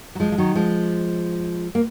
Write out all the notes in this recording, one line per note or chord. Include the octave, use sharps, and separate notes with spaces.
F#3
F3 G#3
F3
D#3 F#3
F3 G#3
A#3